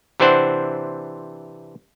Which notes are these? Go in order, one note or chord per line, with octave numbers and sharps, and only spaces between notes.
C3 E3 C4 D4 C5 F#5